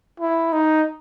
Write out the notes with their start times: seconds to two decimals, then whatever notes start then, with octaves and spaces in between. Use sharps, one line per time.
0.20 E4
0.53 D#4